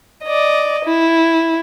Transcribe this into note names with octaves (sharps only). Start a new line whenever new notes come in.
D5 D#5
E4